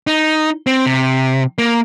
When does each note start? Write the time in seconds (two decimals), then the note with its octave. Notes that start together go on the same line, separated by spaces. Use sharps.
0.07 D#4
0.67 C4
0.86 C3
1.58 A#3